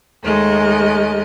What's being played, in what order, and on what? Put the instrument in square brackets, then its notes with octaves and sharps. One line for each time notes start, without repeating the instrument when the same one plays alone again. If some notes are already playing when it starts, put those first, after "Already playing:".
[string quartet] D#2 G#3 A3 D#5